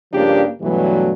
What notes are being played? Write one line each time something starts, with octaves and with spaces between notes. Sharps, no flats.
G2 C#3 F3 A#3 D4 G4
G2 B2 E3 F#3 G3 A3